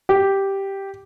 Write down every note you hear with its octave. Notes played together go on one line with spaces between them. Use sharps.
G4